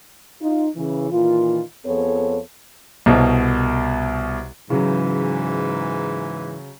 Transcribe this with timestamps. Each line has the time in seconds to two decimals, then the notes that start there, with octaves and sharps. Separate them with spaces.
0.42 D#4 F4
0.77 C#3 E3
1.11 A#2 D#3 E3 F4
1.85 F2 F3 B3 G#4 A4 C#5
3.06 C2 B2
4.70 G#2 C#3 E3 F#3